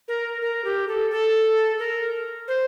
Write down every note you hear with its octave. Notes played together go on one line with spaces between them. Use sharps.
A#4
A#4
G4
A4
A4
A#4
C5